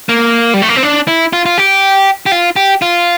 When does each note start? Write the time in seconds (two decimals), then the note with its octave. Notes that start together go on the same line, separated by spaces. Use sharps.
0.09 A#3
0.54 G3
0.62 A3
0.69 A#3
0.76 C4
0.83 D4
1.08 E4
1.33 F4
1.46 F4
1.58 G4
2.26 G4
2.32 F4
2.56 G4
2.82 F4